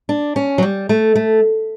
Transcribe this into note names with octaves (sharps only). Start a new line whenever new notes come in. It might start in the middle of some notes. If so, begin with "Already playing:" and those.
D4
C#4
F#3
G3
A3
A3